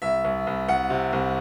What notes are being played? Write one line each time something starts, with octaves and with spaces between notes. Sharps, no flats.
C2 E5
C2
C2
C2 F#5
C3
C2